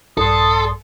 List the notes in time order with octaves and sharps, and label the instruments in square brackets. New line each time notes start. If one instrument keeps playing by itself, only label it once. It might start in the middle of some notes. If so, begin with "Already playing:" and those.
[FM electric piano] A#1 G2 [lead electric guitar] A4 [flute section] D5 C6 D#6